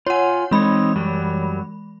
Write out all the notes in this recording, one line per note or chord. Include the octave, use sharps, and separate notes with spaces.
F4 C#5 F#5 G#5
E3 G#3 C4 D#4 C#5 B5
F#2 F#3 G3